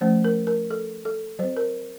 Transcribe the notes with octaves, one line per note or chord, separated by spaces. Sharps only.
F3 A3 C#4 C5
A#4
A#4
A4
A4
F#3 C4 C5
A#4